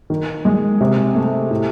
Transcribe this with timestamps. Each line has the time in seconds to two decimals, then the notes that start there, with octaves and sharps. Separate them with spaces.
0.10 D#3
0.45 G#3
0.81 C3
1.15 A3
1.50 A2